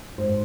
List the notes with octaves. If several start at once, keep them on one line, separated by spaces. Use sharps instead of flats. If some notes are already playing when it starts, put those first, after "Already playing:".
G#2 C5